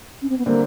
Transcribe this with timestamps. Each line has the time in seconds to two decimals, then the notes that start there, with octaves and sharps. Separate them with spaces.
0.22 C#4
0.29 C4
0.38 B3
0.46 D3 G3 A#3 C4